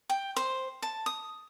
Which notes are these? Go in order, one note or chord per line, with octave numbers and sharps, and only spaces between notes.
G5
C5
A5
D#6